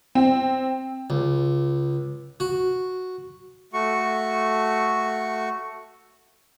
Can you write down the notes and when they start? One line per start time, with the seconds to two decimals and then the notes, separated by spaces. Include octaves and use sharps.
0.15 C4
1.10 C#2
2.40 F#4
3.73 A3 F#4 C#6